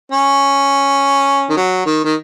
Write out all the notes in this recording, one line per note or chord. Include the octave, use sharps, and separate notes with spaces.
C#4
D#3
F#3
D#3
D#3